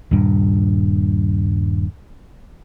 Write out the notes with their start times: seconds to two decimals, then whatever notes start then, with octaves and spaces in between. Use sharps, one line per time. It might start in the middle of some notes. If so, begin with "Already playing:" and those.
0.11 D#1 G2